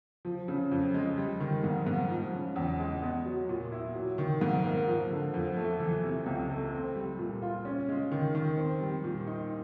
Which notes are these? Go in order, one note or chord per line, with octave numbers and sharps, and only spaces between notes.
F3
C#3
F2
G#3
G3
D#3
G#2
G#2
F3
C#3
E2
G#3
B3
F#3
A#2
E4
F#3
D#3
G#2
A#3
F3
D3
F2
A3
E3
C3
C#2
A3
C4
G3
A#2
F4
C#4
G#3
D#3
D#3
C4
G3
A#2
D#4